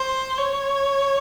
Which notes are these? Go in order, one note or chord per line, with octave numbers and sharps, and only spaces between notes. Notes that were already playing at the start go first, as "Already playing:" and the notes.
Already playing: C5
C#5